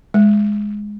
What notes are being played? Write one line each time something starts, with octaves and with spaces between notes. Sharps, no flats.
G#3